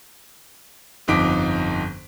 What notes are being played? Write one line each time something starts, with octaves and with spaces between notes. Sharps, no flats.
G1 F2 D#4 D6 B6 D7